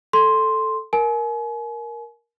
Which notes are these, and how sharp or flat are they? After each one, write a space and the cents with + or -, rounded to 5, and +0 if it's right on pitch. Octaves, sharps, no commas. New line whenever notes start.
A4 +0 C6 +0
A#4 +5 G#5 +35